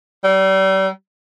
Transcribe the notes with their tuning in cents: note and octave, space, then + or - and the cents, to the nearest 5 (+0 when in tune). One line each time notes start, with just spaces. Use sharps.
G3 -35